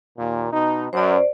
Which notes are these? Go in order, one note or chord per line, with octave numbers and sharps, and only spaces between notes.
D#2 A#2
B2 D#4
F#2 C5 D5